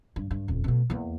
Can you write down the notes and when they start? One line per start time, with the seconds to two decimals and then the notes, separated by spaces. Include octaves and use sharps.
0.16 G2
0.31 G2
0.48 D#1 F2
0.64 B2 A3
0.90 E2 A#3